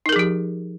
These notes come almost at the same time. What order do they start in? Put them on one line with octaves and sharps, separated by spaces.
D#4 A#4 G#4 F3 G4